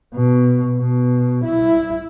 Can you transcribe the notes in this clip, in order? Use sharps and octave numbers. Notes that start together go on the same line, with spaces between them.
B2
B2
E4